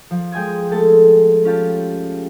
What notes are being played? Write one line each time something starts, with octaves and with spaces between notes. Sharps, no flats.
F3
G#3 G5 G#5 D#6 G#6
G#3 A3 A4 A5
C#4 F4 G4 A5